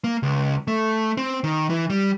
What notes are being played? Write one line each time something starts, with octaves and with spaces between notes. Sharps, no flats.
A#3
C#2
A3
C4
D#3
E3
G3